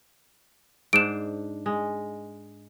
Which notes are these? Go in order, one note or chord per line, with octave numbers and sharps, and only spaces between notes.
G#2 D4 C5 D7 E7
G#3